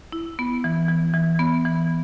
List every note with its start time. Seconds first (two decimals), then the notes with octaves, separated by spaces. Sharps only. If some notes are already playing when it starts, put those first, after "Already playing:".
0.12 E4
0.39 B3
0.64 E3
0.88 E3
1.14 E3
1.39 B3
1.65 E3